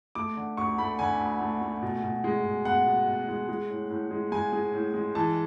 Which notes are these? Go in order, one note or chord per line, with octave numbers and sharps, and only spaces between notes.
A3 D6
D3
D2 C#6
A3 B5
D3 G#5
D2
A3
A3
B2
B2
G#3
B2
B3 F#5
B2
B2
G#3
G#3
A2
A2
G#3
G#3 G#5
G#3
A2
G#3
E3 A5